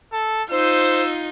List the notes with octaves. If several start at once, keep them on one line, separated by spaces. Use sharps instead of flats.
A4
D#4 F4 C5 E6